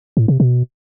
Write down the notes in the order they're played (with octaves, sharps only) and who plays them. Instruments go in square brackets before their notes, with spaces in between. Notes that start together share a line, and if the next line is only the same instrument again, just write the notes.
[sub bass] A2
C3
B2